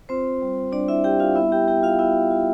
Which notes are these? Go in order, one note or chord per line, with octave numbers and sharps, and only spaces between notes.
C4 F4 C5
G3
G3 D4 D5
E4 E5
G3 G4 G5
F4 F5
B3 E4 E5
G4 G5
B3 G4 G5
F4 F5
B3 E4 E5
F4